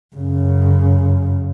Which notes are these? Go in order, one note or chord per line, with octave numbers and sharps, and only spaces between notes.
F#2 C#3